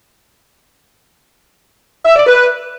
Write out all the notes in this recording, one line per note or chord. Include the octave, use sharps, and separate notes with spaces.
E5
D5
B4